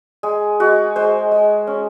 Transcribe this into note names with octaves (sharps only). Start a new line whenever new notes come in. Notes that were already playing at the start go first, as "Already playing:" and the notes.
G#3 G#4
G#3 F#4
G#3 C5
G#3
C#4